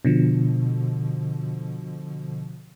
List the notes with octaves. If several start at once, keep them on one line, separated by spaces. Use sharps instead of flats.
B2 D3 F3